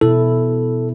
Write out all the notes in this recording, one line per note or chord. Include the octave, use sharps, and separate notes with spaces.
B2 E4 A4